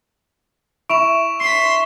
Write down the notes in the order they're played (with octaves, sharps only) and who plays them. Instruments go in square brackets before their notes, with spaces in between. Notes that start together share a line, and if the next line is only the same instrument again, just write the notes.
[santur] E4 [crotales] C#6 E7 F7 [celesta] D7
[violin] C6 B6 [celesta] C7